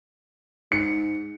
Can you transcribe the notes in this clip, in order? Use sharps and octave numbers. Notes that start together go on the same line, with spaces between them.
G#2 C#7